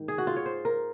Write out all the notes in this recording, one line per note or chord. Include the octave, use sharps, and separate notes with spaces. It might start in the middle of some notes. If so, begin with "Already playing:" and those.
Already playing: G#2 D#3
G#4
F#4
F4
C#5
C5
A#4